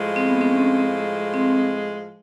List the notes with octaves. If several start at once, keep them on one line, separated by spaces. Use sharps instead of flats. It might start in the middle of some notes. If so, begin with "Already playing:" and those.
Already playing: A2 F3 G#3
C4
B3
C4
C#4
C4
C4